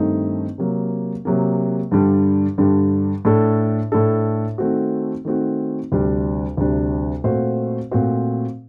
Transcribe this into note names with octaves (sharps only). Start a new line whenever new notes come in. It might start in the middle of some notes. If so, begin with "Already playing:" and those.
Already playing: G2 D#3 A3 C4 D#4
C3 F#3 A#3
C3 F#3 A#3
G2 D3 G3
G2 D3 G3
A2 A3 D4 A4
A2 A3 D4 A4
D#3 A3 C4 F#4
D#3 A3 C4 F#4
D2 C3 G3 D4
D2 C3 G3 D4
A#2 A3 C4 F#4 C5
A#2 A3 C4 F#4 C5